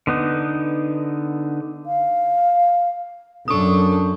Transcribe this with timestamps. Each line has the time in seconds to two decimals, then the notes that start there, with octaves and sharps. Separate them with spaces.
0.07 D3 B3 D#4
1.86 F5
3.48 F#2 D4 A4 C#6 D#6